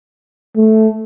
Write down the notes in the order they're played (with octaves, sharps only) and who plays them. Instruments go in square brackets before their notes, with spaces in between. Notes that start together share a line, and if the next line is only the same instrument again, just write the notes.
[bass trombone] A3